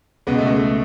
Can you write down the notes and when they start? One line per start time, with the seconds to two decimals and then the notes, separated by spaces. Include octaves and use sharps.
0.27 C#2 B2 G#3 B3
0.38 A3
0.47 G#3
0.56 A3